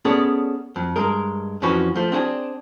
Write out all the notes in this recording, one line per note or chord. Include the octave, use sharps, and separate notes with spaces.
B3 C#4 G#4 A4 D5
F2
G2 G#3 A#4
F2 E3 F3 C#4 F#4 B4
F3 A3
C4 D4 F#4 G#4